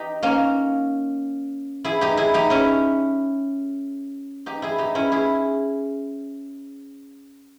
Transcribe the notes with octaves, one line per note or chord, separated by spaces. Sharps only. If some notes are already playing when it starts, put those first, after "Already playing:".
Already playing: D#4 G4
A#3 C#4
E4 G#4
D#4 G4
E4 G#4
D#4 G4
C#4 E4
D#4 G4
E4 G#4
D#4 G4
C#4 E4
E4 G#4